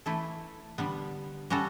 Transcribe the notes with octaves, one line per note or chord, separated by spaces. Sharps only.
E3 A3 E4 A4
D3 G3 B3
G3 C#4 F#4 A4